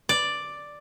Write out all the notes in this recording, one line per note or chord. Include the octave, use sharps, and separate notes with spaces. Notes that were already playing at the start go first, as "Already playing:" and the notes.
D5